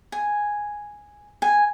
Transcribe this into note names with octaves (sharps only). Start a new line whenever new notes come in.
G#5
G#5